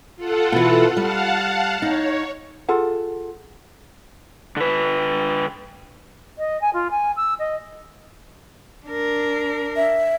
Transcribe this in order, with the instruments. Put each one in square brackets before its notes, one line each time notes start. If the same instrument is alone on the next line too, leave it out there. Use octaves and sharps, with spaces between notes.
[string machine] F4 A4 F#5
[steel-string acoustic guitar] B2 E3
[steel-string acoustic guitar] G3 [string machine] F5 F#5 A5
[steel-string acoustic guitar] D#4 [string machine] C#5
[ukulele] F4 G#4 A4 F#5
[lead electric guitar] D3 B4
[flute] D#5
G#5
F4
G#5
E6
D#5
[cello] D4 A#4
[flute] E5